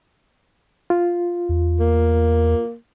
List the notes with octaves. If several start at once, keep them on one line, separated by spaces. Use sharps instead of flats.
F4
E2
A#3